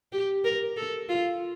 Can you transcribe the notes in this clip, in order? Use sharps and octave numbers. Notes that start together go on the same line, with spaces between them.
G4
A#4
A4
F4